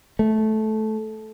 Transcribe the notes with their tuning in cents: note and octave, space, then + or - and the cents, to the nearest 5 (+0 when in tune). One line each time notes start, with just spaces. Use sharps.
A3 -15